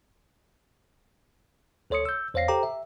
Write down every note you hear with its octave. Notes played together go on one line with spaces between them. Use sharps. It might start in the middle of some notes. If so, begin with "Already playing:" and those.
D2 A4 C#5 C6 D#6 C#7
E6 G6
E2 C5 C#5 F5 A#6 C7
G4 A4 C5 G5 A#5 D6
E5